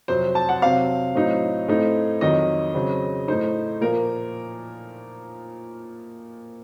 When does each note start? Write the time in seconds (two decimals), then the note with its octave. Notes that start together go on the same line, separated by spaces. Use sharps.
0.08 F2 C3 F#3 C4 C5
0.35 A5
0.49 F#5
0.62 C3 F#3 C4 F5
1.15 A2 F#3 C4 D#4
1.68 A2 A3 C4 D#4
2.21 F2 D#3 F#3 D#5
2.74 C#3 F#3 C4
3.28 A2 A3 D#4 C5
3.81 A#2 F3 A#3 A#4